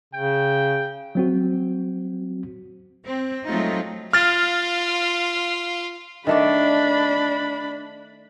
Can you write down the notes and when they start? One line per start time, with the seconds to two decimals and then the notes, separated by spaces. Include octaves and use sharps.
0.14 C#3 G5
1.15 F#3 C4 F#4
3.04 C4
3.47 F#3 G#3 A3 C4 D#4 F4
4.13 F4 F5 F6 A6
6.27 D#3 A3 D4 D5 B5